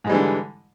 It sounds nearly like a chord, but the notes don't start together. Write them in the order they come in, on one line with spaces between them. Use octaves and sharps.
G#2 G#3 G3 E3 D3